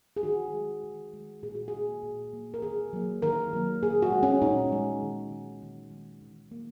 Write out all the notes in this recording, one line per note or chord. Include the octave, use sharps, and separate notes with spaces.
G#4
D#3 F#4
G#3
D#3
G#3
A#2 G#4
F#4
G#4
A#3
A#2
A#3
A#4
D#3 G#4
F#3 A#3
D#3 A#4
F#3 A#3
A#2 G#4
F#4
G#3
C#4
A#2 D#4
G#3
D#3
G#3
D#3
G#3
D#3
A#3